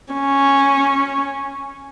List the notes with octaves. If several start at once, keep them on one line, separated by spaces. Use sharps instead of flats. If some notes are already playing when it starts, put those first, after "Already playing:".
C#4